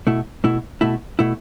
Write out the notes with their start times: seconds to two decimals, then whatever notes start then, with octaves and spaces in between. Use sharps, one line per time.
0.07 B2 A3 E4
0.44 B2 A3 E4
0.81 B2 A3 E4
1.19 B2 A3 E4